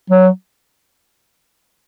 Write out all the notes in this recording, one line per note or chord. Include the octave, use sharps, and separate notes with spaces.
F#3